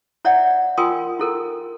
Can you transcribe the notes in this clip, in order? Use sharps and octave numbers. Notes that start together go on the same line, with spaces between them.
E4 C#5 D5 E5 F#5
F4 A#4 G5 G#5 C6 D#6
E4 A4 A#4